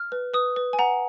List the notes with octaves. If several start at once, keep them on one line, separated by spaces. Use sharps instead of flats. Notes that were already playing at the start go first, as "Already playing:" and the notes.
Already playing: F6
B4
B4 D#6
B4
G#5
F#5 A#5